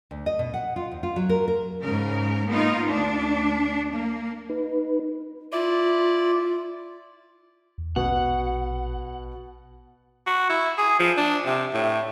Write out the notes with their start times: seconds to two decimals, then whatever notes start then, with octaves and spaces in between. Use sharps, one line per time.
0.11 D2
0.26 D#5
0.39 B2
0.54 F#5
0.76 F4
0.91 D#2
1.03 F4
1.16 F#3
1.29 A#4
1.48 A#4
1.82 G#2 C#3 A#4
2.49 A#3 B3 D#4 F4 A#4
2.88 D2 D4
3.93 A#3
4.49 D#4 B4
5.52 E4 F4 D5
7.78 E2
7.96 A#1 B2 F#5
10.27 F#4
10.50 E4
10.78 G#4
10.99 F3
11.17 D4
11.46 C3
11.74 A2